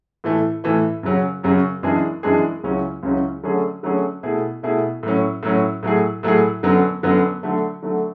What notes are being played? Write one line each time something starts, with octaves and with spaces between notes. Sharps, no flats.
A2 E3 A3
A2 E3 A3
F#2 C#3 F#3 C#4
F#2 C#3 F#3 C#4
F#2 E3 G#3 D4 G#4
F#2 E3 G#3 D4 G#4
C#2 C#3 F#3 C#4 E4
C#2 C#3 F#3 C#4 E4
D3 F#3 A3 C#4 G#4
D3 F#3 A3 C#4 G#4
B2 A3 E4 G#4
B2 A3 E4 G#4
A2 F#3 C#4
A2 F#3 C#4
A2 F#3 A3 E4 G#4
A2 F#3 A3 E4 G#4
F#2 D3 F#3 B3
F#2 D3 F#3 B3
D3 F#3 A3
D3 F#3 A3